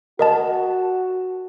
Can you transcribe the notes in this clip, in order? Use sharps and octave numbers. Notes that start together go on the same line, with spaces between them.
F#4 A#4 D#5 A5